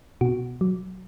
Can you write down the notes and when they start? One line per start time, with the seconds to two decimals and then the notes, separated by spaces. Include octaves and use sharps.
0.21 B2 F#4
0.61 F#3